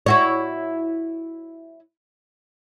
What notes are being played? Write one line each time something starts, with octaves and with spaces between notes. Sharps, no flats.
E4 F#4 C#5